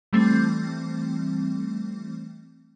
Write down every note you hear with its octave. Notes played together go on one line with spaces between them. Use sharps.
E3 G3 A3 C4